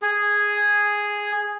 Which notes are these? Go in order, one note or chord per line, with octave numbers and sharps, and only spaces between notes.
G#4